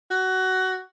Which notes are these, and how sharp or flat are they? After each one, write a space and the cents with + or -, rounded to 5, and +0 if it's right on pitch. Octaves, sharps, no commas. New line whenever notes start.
F#4 +20